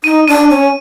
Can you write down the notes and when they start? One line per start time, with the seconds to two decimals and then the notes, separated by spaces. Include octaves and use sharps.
0.04 D#4 D#7
0.28 D4 D#7
0.50 C#4